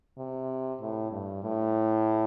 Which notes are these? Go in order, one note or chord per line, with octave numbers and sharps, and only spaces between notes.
C3
A2
G2
A2